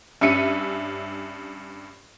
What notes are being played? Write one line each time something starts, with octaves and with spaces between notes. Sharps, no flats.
G2 C#4 E5 C#7 D#7